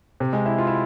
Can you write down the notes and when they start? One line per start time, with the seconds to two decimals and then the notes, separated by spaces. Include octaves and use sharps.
0.20 C3
0.33 G#3
0.46 E4
0.58 F4
0.67 E4